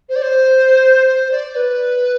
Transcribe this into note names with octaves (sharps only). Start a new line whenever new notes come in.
C5
D5
C5
C5
D5
B4